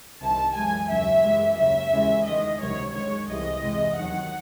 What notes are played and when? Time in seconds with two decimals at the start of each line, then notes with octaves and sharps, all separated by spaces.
0.21 C2 C3 D#3 A5
0.55 F#2 E3 G#3 G#5
0.89 D#2 C#3 F#3 E5
1.24 F#2 E3 G#3
1.57 D#2 C#3 F#3 E5
1.92 D#2 C#3 E3 G#3
2.26 E2 D#3 G#3 D#5
2.61 C#2 C3 D#3 F#3 C#5
2.94 F#2 D#3 G#3 C#5
3.28 C2 C3 E3 G#3 D#5
3.62 E2 C3 E3 G#3
3.96 D#2 D#3 F#3 F#5